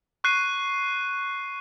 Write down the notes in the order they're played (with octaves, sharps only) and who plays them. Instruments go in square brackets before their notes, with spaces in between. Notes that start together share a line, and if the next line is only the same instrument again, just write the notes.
[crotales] C#6 F#6 C7 D#7